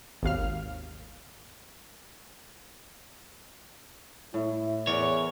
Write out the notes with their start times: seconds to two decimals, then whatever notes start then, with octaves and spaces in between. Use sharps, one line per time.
0.23 G#1 D#2 F5 F6
4.34 A2 E4
4.87 E2 E3 A#4 C#5 D5